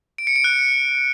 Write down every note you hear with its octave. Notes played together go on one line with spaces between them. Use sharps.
D7
C#7
D7
F#6